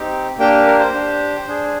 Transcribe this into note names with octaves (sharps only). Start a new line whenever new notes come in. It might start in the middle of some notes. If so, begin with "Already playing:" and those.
Already playing: C4 D#4 G4
A#3 D4 G4 G5
A#4
C5
D4 G4
D4 G#4